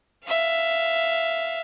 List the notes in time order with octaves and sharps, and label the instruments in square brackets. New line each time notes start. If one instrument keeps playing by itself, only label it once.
[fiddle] E5 F5